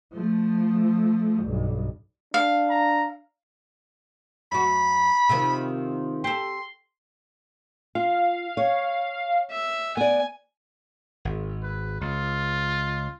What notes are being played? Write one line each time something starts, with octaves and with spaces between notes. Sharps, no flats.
F3 A3
B1 G2
D4 F5
A#5
F#2 F#4 B5
C3 D#3 F3
G4 A4 C6
F4 F5
C#5
E5
B3 D5 G#5
G#1
B4
C#2 F4